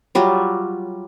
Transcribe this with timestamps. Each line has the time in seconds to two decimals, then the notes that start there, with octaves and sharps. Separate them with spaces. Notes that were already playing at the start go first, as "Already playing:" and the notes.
0.15 F#3 G3 F4